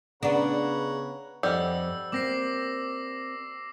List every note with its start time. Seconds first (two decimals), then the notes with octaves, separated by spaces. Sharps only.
0.23 C#3 B3 D4 B4 C#5 F#5 A#5
1.43 F2 G3 D#5 F#5 E6
2.12 A#3 C4 D6 A#6 C7